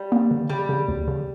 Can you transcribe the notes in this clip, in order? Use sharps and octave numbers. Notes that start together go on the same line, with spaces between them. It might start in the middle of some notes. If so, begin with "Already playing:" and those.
Already playing: G3
A#3
D3
C#3 G3
C#3
D2
C#3